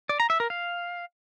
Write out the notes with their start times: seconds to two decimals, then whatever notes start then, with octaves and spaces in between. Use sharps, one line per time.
0.09 D5
0.20 A#5
0.30 E5
0.40 A#4
0.50 F5